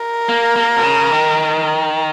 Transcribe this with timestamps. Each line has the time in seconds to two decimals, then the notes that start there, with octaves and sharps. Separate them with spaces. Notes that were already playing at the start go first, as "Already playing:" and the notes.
Already playing: A#4
0.29 A#3
0.56 A#3
0.77 B2
0.84 C#3
1.11 D#3